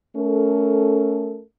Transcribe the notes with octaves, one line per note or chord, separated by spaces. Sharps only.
A3 C#4 A4 A#4